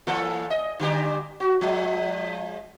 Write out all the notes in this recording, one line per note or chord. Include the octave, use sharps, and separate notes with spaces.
E3 A#3 A4
D#5
D3 G3 G4
F#4
F3 G#3